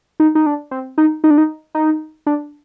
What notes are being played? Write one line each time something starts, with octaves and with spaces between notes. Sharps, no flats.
D#4
D#4
D4
C4
D#4
D#4
D4
D#4
D#4
D4